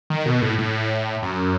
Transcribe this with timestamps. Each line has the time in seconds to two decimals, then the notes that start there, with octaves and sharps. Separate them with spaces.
0.10 D#3
0.26 B2
0.42 A2
0.58 A2
1.23 F#2